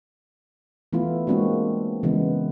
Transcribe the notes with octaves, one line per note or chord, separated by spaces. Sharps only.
E3 A3 B3 E4 F4
G#3 A#3 C4 D4 F#4
C#3 E3 G#3 B3